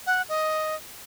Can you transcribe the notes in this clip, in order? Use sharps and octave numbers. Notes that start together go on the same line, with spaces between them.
F#5
D#5